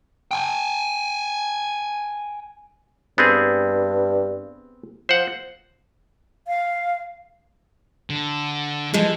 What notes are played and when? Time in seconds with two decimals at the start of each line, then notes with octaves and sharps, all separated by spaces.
0.31 G5 G#5
3.18 G2 B3 C4 G#4
5.09 F3 C5 F#5
6.48 F5
8.10 D3
8.94 E3 F3 G#3